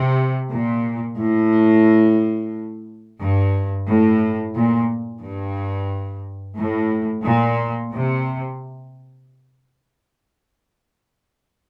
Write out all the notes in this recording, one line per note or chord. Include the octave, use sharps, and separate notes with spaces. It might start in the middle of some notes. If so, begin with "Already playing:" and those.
Already playing: C3
A#2
A2
G2
A2
A#2
G2
A2
A#2
C3